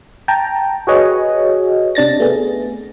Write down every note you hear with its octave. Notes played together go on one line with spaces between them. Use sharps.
G5 A5 A#5
F#4 G#4 B4 C#5 D#5 F#5
C3 D4 A6 A#6
A3 B3 G#4